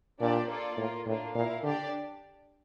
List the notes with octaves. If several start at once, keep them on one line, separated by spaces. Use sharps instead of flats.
A#2 D4 G4 D5
A#3 F4 A4 D5
A2 A#3 F4 A#4
A2 A#3 D4 F4
A#2 E4 A#4 F5
D3 D4 G4 D5